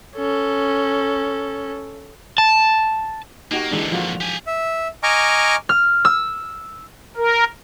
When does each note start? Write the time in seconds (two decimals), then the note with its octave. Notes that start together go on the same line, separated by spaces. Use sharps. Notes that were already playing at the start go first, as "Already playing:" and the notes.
0.16 C#4 A4
2.38 A5
3.51 A#3 D#4 F#4 G4
3.71 A#2 D3 E3 G#3 D4
3.92 F3 F4 F#4
4.20 G4 G#5
4.47 E5
5.03 D#5 G#5 A#5 C#6 D6 F6
5.69 F6
6.05 E6
7.16 A#4